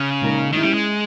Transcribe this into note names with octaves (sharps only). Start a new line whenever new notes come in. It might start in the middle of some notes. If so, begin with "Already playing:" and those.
Already playing: C#3
A#2 G#3 D#4 A#4
D#3 G#3 C#4 E4
G3
G#3